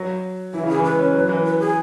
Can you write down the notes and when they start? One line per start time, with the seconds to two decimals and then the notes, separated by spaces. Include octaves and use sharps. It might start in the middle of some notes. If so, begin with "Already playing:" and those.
Already playing: F#3
0.53 E3 E4
0.63 C#3
0.69 G#4
0.74 E3
0.84 G#3 B4
0.99 C#4
1.14 F#3
1.29 E3
1.45 B4
1.60 G#4